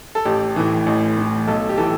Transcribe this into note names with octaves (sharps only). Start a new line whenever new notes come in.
A4
A1 G4
A2 E3
A1
A2 E3
B1 A4
G4
A2 E3 A4